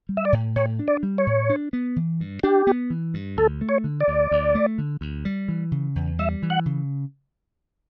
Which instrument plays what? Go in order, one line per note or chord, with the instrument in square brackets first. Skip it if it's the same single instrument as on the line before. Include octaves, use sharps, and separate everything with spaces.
[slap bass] G3
[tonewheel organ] E5
D5
[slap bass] A2
[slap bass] A2 [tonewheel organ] C#5
[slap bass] D4
[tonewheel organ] D5
[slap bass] G3
[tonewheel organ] C#5
[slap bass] A2
D4
B3
E3
G2
[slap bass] D4 [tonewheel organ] G4
[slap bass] B3
E3
G2
[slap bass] D2 [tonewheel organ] A4
[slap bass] A3
[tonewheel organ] C#5
[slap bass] D3
[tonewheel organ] D5
[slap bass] D2
D2
A3
D3
D2
G3
E3
C#3
E2
[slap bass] G3 [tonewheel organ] E5
[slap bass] E3
[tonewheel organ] F#5
[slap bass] C#3